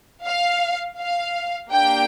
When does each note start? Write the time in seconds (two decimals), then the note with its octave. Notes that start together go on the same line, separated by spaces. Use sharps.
0.25 F5
0.99 F5
1.70 A#3 D4 G4 G5